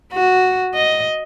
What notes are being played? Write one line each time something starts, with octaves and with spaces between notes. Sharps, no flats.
F#4
D#5